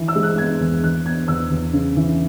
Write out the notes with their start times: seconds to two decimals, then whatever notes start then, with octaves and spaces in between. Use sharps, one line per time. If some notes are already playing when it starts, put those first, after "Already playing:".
Already playing: E3
0.08 E6
0.16 G#3
0.23 F#6
0.38 B3 G#6
0.60 E2
0.83 E3 F#6
1.06 B3 G#6
1.28 E2 E6
1.51 E2
1.73 C#3
1.96 E3